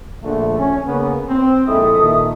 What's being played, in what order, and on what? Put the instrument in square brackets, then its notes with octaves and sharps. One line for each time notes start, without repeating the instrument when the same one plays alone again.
[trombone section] A#1 D3 A3
C#4
C#3 A#3 B3
C4
[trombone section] A#1 G#3 E4 [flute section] A4 E5 D#6
[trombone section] A#2 D#3